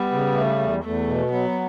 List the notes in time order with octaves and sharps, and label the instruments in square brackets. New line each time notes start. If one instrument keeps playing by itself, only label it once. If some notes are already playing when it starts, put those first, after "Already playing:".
Already playing: [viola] G3 [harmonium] B3
[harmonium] C#3
A3
E2
[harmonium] E2 [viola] A3
[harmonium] B2
[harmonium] F#3 [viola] B3